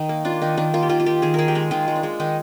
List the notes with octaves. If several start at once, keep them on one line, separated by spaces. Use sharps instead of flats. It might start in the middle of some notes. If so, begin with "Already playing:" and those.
Already playing: D#3 D#4
A#3
D4 F4
D#3 D#4
D#3 D4
A#3 F4
G4
D#3 F4
F4
D#3 G4
D#3 G#4
D#3 G#4 A#4
G4
G#3 G#4
D#3 F4
G#3
D4
G#3
D#3 D#4